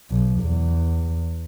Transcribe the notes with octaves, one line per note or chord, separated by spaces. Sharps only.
B1
E2